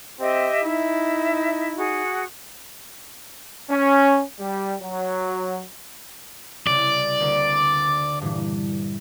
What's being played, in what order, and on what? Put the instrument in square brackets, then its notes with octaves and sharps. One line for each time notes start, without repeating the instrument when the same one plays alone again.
[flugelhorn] C4 [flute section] G4 D#5 E5
[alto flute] D#4 [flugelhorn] E4 [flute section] E5
[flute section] F#4 G#4
[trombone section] C#4
G3
F#3
[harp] C2 C#3 [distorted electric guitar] D5
[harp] D2 A#3
G2 A#2 E3